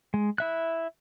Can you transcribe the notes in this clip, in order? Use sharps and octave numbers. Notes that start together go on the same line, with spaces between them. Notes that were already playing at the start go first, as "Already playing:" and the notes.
G#3
E4 E5 F#6